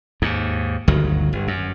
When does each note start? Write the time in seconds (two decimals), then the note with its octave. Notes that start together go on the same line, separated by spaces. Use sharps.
0.22 D#2 G#2
0.88 G1 D2 D#3 F#3
1.33 G1
1.48 F#2